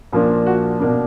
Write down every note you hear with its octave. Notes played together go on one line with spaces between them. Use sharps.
A#2 F3 A#3 D4
F#4
B2 A#3 D4